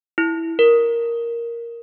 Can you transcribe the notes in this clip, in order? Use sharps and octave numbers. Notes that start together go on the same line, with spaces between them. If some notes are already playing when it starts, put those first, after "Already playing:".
E4
A#4